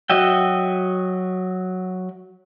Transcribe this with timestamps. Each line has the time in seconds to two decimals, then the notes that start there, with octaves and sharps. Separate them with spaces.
0.10 F#3 F#4 D#5 E5 G5